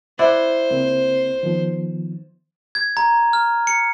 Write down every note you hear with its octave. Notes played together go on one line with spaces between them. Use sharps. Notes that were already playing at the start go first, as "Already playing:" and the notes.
E4 C5 D5 F#5
C#2 A#3 C4
D#3 F3 B3
G#6
A#5
F6
C#7